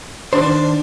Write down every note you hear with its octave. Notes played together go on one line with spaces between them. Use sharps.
D#3 D4 C5